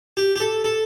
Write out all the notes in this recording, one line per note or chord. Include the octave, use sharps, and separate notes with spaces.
G4
G4
A4
A4